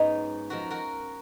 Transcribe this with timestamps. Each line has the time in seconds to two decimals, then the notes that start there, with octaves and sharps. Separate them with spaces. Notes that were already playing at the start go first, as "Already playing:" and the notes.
Already playing: G#2 F#3 B3 C#4 D#4
0.50 F#2 F3 F#4 A#4
0.71 F#4 A#4